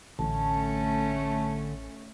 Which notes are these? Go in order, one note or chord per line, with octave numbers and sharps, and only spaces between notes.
A1 D3 A3 C#4 A5